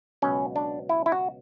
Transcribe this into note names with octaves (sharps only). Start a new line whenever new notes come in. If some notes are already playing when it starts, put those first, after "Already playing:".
C#2 B2 F#3 C#4
D4
E4
E4
F#4